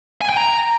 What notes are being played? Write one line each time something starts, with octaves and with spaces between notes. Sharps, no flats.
G#5
G5
A#5